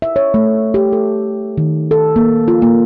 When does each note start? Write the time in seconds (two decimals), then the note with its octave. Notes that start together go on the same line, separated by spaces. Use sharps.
0.02 E5
0.16 C#5
0.34 A3
0.74 G4
0.93 A4
1.58 D#3
1.91 A4
2.16 A#3
2.48 F4
2.62 A#3